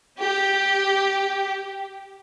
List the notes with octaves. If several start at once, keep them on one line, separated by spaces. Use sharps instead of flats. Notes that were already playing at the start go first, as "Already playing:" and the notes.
G4